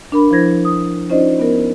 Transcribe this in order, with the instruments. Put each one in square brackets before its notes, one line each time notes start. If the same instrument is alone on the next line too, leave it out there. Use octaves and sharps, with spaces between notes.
[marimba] D4 A#4 B5
F3 E4 C5 G#6 A#6
D#6
C#4 D#4 F4 C5 D5 D#5
B3 A#4